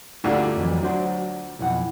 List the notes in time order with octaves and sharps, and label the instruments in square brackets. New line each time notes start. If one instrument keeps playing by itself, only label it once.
[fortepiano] D2 A#2 D3 [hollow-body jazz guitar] G3 E4 [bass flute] F#4
[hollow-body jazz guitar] F2 E3 [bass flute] F#3
[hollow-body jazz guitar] D4 F#4 C5
[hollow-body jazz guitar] B1 F2 F#5 [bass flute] E4